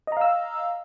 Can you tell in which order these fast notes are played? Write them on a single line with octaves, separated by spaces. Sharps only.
D#5 A#5 F5 E6